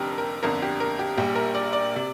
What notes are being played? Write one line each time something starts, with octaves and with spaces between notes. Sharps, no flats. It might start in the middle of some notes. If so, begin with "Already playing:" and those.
Already playing: F1 F2 D3 G4 A#4
A#4
G1 F2 D3 A#4
G4
A#4
G4
A#1 A#2 G3 G4
A#4
D5
D5
C3